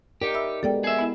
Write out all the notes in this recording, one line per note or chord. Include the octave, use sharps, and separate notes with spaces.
D#4 G4 A#4 D5
E5 B5 E6
G#3 B3 G4 A4 D5 G5
G#4 E5
B3 E4